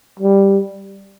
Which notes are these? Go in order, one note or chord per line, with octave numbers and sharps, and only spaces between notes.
G3